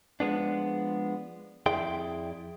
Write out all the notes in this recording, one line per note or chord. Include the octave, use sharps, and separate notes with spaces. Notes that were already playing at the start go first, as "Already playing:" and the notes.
F3 G#3 B3 D4
F2 E4 G#4 D5 G5 C6